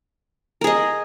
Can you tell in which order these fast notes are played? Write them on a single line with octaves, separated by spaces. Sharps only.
A#4 G#4 D#5